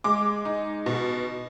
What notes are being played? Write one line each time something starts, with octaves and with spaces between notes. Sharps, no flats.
G#3 D6
D#4
B2